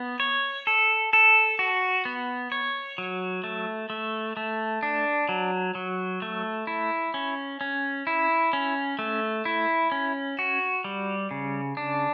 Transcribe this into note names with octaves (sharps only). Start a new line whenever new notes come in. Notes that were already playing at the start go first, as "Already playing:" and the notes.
Already playing: B3
C#5
A4
A4
F#4
B3
C#5
F#3
A3
A3
A3
D4
F#3
F#3
A3
E4
C#4
C#4
E4
C#4
A3
E4
C#4
F#4
G3
C#3
D4